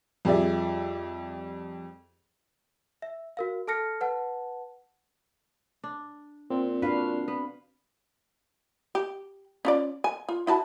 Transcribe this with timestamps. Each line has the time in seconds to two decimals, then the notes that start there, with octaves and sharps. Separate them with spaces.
0.25 F2 F3 G3 G#4 D5 E5
3.02 E5
3.37 F#4 A#4 F5
3.68 A4 A5 F6 A#6 C#7
4.01 B4 F#5 A5
5.84 D4
6.50 A#2 C4
6.82 D4 F#4 B4 F5
7.28 B3
8.95 G4
9.65 C#4 F4 D5
10.04 G#5
10.29 F4
10.47 E4 F#4 A5